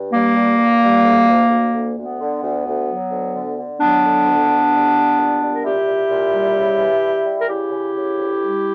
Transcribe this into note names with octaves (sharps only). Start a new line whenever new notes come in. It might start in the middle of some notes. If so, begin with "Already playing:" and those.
Already playing: G2
G3 A#3
G2
G2
G3
D2
D2
D2
D2
D2 B3
D3
D2
D2
F#3
D2
D3
D3
F#3 B3 D4
D3
D2
D2
G3
G3
A#2
G3
A#4
A#2 E4 G4
A#2
A#2
G3
C#3
E3
G3
G3
A#4
C#3 E4 G4
C#3
C#3
D2
G3